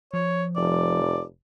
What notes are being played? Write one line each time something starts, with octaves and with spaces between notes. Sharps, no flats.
F3 C#5
F1 D5